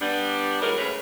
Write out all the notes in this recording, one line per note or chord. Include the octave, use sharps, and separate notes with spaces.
G3 B3 D4
D#3 E3 F#3 G#3 A#4
C#3 A3 C#4 G#4 B4 C#5